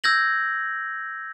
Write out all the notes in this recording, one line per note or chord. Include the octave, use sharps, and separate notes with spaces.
E6 G6 G#6 A#6 F#7